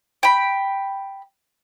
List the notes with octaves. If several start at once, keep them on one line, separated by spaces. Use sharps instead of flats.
G5 B5